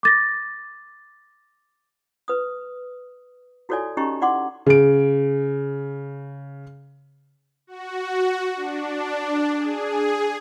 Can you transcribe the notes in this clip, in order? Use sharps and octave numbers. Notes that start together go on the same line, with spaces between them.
D6 A6 A#6
B4 D#6
E4 F#4 A4 C#5 D5 G#5
C#4 D#4 G4 D#5 A#5 C#6
D#4 E4 D5 F#5 C6 D6
C#3 D7
F#4
D4
G#4